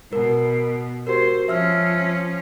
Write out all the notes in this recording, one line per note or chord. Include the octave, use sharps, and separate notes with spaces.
B2 A#4
F#4 G4 A#4 C5
F3 C#4 E5 E6 F6